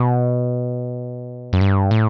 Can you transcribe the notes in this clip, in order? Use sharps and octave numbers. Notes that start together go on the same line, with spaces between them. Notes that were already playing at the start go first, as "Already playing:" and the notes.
Already playing: B2
F#2
G2
A2